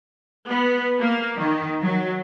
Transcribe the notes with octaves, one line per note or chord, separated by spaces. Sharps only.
B3
A#3
D#3
F#3